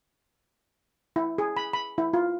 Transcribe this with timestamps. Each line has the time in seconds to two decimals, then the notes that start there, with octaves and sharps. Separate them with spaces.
1.16 E4
1.38 G#4
1.56 B5
1.73 B5
1.98 E4
2.13 F4